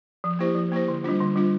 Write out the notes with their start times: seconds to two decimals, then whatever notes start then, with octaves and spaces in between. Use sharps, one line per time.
0.24 F3
0.39 A#3 E4 G4 C5
0.55 F3
0.72 A#3 E4 G4 C5
0.88 D3
1.04 G3 D4 F4
1.20 D3
1.36 G3 D4 F4